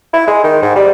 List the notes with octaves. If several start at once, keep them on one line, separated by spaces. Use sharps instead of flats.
E4
G#3
D#3
G#2
G3